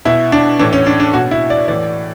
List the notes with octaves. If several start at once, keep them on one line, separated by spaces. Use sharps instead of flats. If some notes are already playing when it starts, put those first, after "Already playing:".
B2 E4
D4
A2 E3 D4
C#4
D4
D4
B2 F#4
E4
D5
A2 E3 D5